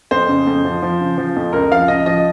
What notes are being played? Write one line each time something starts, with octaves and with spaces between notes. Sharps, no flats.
F2 C5
C#3
F2
F3
F3
C#3
F3
F2
C#2 A#4
F3 F5
C#2 D#5
F3 D#5